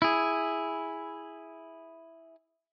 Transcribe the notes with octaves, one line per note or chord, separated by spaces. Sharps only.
E4 G#4